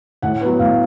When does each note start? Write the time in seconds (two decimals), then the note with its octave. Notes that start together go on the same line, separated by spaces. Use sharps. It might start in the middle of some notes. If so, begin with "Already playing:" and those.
0.22 A2 F#5
0.41 F#3 B3
0.59 A2 F5